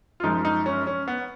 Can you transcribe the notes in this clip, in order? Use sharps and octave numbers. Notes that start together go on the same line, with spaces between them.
F4
F#2 F3 G#3 D#4
D#4
C#4
C#4
B3